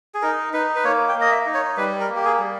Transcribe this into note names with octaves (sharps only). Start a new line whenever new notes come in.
G#4
D#4 A#4
D#4 B4
B4
A#3 C#5
G5
A#3
D#5
E5
D#4
C#5
G3 B4
A#4
A#3
G4
G#4
G3